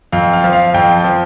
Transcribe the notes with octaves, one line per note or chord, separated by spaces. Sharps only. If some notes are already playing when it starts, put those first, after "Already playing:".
F2 F5
F5
F3
F5
F2 G5
F3